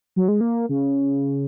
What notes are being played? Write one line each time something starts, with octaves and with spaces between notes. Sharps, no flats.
F#3
G#3
A#3
C#3